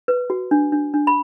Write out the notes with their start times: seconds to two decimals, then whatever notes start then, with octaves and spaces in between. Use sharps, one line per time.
0.08 B4
0.30 F#4
0.51 D4
0.72 D4
0.94 D4
1.07 B5